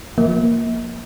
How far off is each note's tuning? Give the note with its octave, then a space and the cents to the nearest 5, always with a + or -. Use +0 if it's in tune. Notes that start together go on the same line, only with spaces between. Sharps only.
F3 +20 A#3 +0 E5 -45